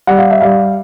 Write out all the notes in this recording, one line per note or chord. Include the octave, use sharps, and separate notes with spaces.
G3 F#5
F5
E5
G3 F5